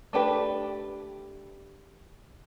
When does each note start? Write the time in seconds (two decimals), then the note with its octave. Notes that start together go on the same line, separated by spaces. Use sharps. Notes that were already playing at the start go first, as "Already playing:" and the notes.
0.13 A3 D4 G4 B4